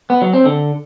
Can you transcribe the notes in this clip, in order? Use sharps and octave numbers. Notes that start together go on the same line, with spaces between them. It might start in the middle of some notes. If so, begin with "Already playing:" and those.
B3
F#3
C4
D3